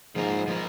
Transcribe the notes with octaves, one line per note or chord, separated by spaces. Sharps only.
G#2 F3 A#3 F4 A#4
F3 A#3 F4 A#4